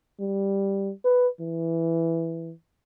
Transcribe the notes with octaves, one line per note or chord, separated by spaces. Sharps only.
G3
B4
E3